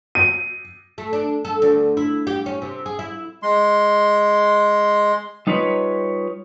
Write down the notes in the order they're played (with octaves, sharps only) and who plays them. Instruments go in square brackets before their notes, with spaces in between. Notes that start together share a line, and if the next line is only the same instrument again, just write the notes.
[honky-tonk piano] D#7
[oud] A3
D4
A4
D2
E4
G4
C#4
C3
G#4
E4
[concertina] G#3 C6
[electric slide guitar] G3 D#4 F4 B4 C#5